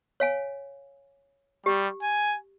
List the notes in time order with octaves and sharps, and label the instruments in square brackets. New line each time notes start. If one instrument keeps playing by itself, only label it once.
[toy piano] C#5 F5 G#5
[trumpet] G3 [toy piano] G4
[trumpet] G#5